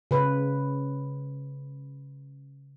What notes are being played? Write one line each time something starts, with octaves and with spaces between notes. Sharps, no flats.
C#3 B4